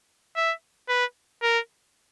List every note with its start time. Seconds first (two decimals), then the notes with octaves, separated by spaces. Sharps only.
0.37 E5
0.89 B4
1.43 A#4